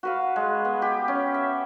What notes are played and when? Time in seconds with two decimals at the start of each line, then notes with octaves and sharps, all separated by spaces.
0.03 F#4 B4 F5
0.36 G#3
0.65 B3
0.82 G4
1.08 C#4
1.34 E5